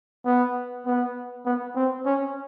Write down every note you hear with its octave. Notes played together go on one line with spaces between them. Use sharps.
B3
B3
B3
C4
C#4